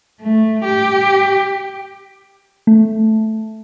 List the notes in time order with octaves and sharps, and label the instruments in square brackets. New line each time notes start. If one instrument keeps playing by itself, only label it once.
[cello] A3
G4
[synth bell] A3